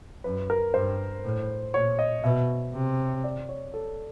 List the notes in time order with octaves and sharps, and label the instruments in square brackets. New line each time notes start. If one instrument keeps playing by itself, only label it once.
[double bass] F#2 [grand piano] B4
[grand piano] A#4
[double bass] G2 [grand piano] C5
[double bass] A2
[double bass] A#2 [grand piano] C#5
[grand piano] D#5
[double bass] B2 [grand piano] E5
[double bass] C3
[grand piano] D5
C#5
A4